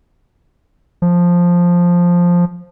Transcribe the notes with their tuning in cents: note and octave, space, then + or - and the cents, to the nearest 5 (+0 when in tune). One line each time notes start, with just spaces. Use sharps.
F3 +5